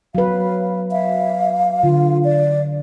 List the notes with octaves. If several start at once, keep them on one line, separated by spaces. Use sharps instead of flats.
F#3 B4 F5
E5 F5
D3 F4
D5